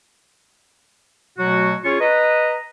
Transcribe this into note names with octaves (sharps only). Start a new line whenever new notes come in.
B2 F#3 A3 F#4
C#4 F4 G#4 C#5 C#6
B4 D#5 A#5